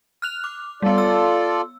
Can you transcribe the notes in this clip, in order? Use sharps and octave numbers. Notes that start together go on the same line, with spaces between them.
F6 F#6 F7
D6
G3 B3 F4 A4 D5
E6